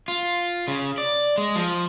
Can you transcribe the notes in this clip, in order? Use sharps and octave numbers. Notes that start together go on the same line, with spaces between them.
F4
C#3
D5
G#3
F3